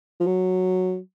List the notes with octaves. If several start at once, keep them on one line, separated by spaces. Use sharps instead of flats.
F3
F#3